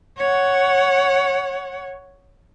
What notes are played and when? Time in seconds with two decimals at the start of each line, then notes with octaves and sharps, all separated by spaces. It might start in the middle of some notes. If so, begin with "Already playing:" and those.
0.17 C#5 F#5